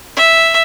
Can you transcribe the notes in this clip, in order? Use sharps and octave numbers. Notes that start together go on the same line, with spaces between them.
E5